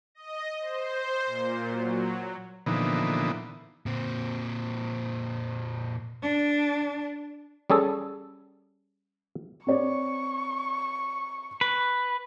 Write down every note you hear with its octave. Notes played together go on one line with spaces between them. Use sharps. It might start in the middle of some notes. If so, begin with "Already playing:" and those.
D#5
C5
A#2
F#3
A#2 D3 E3 F3 B3 D#4
A#2 C4
D4
G3 C#4 G#4 A4
C4 C#5 D5 C#6
B4